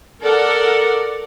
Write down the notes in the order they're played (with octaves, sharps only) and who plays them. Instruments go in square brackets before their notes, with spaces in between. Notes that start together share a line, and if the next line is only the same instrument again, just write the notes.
[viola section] A4 A#4 D5 F#5